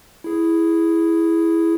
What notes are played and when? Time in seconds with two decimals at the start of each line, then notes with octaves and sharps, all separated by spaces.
0.24 E4 G#4